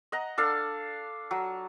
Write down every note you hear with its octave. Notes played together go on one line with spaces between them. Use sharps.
D#5 F#5 A#5
D4 A4 F5
F#3